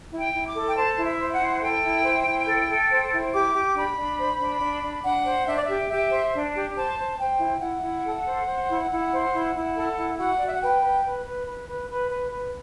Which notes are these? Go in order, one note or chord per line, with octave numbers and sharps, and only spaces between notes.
E4
G5
E4
D6
A4
G5
C5 A5
E4
E5
C5
F#5
E4
A4 G5
E4
C5
E4
A4
A4
C5
E4
G4 D6
G4
D4 B5
D4
C5
D4
D4
D4
D4 F#5
C5
D4 E5
D5
G4 E5
G4 E5
C5
D4
G4
C5 A5
C5
C5 G5
E4
E4 F#5
E4
A4
C5
C5
E4
E4
C5
E4
E4
A4
E4
F#4 F#5
F#4 D5
E5
F#5
B4 G5
B4
B4
B4
B4
B4
B4
B4
B4